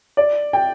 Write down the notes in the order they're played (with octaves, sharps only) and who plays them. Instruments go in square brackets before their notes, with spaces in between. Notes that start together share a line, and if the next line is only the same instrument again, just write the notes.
[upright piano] D5
G5